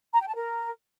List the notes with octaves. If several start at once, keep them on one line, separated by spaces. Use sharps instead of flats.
A#5
G5
A5
A#4